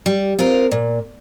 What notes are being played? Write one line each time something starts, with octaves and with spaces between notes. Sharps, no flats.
G3
C4 F4 A#4
A#2